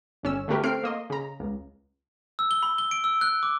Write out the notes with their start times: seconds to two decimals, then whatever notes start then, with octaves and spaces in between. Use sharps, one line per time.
0.23 G1 C#4 E6
0.48 D3 A3 F#4 G4 A#4 B4
0.63 A3 C4 F6 C7 D7
0.83 A#3 D#5 C6
1.10 C#3 A#5
1.40 C#2
2.39 E6
2.51 G7
2.63 B5
2.78 G7
2.91 D7
3.04 E6
3.21 F#6
3.43 D6